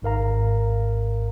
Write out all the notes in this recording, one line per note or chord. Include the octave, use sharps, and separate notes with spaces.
G#1 G#2 A#4 F5 A#5